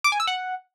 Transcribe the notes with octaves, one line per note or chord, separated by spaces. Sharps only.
D6
G#5
E6
F#5